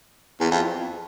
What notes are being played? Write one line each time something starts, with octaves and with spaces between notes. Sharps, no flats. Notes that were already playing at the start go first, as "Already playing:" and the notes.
E2
F2